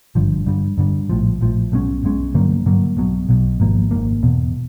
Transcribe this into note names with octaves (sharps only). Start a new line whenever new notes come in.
G#1 G2 D3 F3
G2 D3 G3
G2 D3 G3
A#1 A2 F3
A#1 A2 F3
B1 B2 G#3 C#4
B1 B2 G#3 C#4
G2 D3 F#3 A#3
G2 D3 F#3 A#3
B1 B2 F#3
B1 B2 F#3
G#1 G#2 F3 A#3
G#1 G#2 F3 A#3
E1 E2 B2